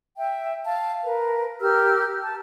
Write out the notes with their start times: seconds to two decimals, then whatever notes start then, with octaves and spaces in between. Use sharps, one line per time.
0.17 E5 G5
0.65 F5 A5
1.05 A#4 B4
1.61 G4 A#4 E6 F6
2.22 A5